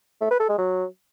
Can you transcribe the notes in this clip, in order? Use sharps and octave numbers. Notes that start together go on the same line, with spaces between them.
A3
B4
A4
G#3
F#3